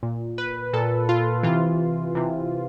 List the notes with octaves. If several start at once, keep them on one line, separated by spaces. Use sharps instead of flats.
A#2
B4
A#2 A4
F4
C3 E3 F4
C3 E3